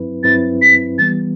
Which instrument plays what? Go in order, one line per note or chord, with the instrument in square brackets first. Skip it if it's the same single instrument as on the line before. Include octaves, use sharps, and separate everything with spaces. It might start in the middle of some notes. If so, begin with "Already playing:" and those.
Already playing: [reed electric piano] G2 F#3 C4 E4 B4
[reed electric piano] G2 F#3 C4 E4 B4 [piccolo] A6
[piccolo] B6
[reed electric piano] E3 G3 B3 [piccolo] A6